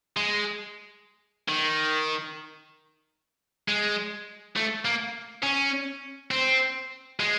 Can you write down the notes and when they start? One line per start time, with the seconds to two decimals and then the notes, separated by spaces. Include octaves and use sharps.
0.17 G#3
1.48 D#3
3.68 G#3
4.56 A3
4.85 A#3
5.43 C#4
6.31 C4
7.20 G#3